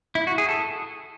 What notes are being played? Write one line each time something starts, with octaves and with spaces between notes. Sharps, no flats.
E4
F#4
G#4
A4